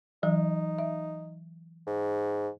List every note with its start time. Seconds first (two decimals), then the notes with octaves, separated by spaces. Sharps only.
0.23 E3 F#3 D#4
0.79 E5
1.86 G#2